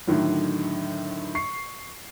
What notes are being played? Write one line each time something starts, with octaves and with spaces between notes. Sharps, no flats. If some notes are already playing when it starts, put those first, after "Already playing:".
A2 D3 D#3 F#3
C#6 C7